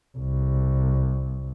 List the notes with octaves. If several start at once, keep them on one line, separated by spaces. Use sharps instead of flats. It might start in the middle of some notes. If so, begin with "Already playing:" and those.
C2